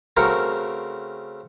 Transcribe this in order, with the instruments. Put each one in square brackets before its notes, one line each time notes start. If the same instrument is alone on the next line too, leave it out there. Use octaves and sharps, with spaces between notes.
[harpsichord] C#3 A3 C4 F#4 A#4